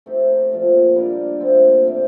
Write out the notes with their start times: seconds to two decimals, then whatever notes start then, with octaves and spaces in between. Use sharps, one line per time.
0.06 A3 C4 D#4 G4
0.52 A#2 F3 C4
0.96 G3 D4 G4 A#4
1.40 A#2 A3 C4
1.85 C3 G3 C4 G4